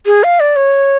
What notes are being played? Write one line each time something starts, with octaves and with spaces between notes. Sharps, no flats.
G#4
F5
D5
C#5